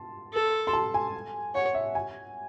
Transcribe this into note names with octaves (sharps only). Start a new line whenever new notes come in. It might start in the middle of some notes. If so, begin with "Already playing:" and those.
Already playing: A5 C6
A4
C6
A5
G#5
C#5 F#5
E5
G#5